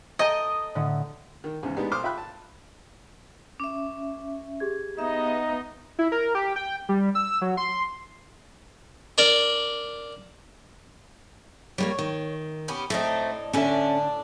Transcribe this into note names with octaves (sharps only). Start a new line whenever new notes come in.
A4 D#5 G5 A#5
A2 D3
D#3
E2 G#2 C#3
G#3 B3 D4 D#4 G4
B1 C5 C6 D6 D#6 F6
F4 E5 G5 B5 F#6
A5
C#4 E5 D6
G4 G#4 G#6
B3 D#4 D#5 E5
E4
A#4
G4
G5
G3
E6
F#3
C6
D4 A#4 D5
G3 A3 A#3 C#5
D#3
B3 C#4 G4
A2 A3 C4 D4 D#4
A2 D3 C#4 D4 A4 E5